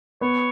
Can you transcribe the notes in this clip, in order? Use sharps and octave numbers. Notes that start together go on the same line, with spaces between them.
B3 C#5